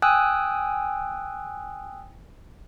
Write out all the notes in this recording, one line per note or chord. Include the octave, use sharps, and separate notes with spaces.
G5 G#5 D#6 E6 F#6